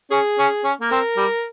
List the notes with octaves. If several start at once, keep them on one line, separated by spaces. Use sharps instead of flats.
C#4 G#4
C#4
C#4
A#3
C4 A#4
G3